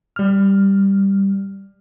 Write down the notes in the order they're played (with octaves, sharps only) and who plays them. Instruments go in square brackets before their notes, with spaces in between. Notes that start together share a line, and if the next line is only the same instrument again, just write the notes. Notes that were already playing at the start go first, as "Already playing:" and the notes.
[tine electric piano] G3 F6